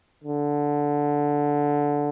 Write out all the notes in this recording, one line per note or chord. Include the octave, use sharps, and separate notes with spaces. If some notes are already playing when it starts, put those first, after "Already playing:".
D3